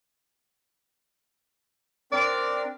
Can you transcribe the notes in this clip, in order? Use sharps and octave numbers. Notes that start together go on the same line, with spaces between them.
C4 D4 A#4 D5